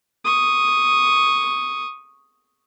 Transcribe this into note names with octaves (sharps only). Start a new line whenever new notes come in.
C#6 D#6